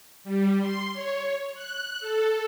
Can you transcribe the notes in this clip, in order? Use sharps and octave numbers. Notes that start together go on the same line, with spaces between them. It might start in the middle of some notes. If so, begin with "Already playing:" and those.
G3
C6
C#5
F#6
A4